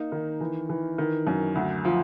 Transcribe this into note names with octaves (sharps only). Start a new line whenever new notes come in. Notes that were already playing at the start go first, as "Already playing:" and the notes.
Already playing: A#3 D#4
D#3
E3
E3
D#3
F#2
D2
F3